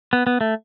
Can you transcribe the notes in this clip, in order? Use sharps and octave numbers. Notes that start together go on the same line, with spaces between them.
B3
B3
A3